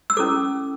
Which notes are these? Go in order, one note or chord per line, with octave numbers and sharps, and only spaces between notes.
E6
C#4 E4 A4 D6